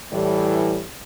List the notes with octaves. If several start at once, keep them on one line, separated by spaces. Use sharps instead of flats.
A2 E3 G3